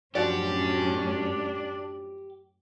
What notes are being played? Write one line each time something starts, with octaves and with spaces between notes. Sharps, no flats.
F#2 A2 F3 C#4 D4 F#4 G4 D5